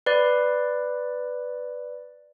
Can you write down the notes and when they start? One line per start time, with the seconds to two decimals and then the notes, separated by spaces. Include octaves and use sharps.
0.06 B4 D5